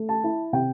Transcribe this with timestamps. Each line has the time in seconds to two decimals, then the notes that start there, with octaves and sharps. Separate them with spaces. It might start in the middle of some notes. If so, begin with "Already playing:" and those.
Already playing: A3
0.09 A5
0.24 E4
0.53 C3 G5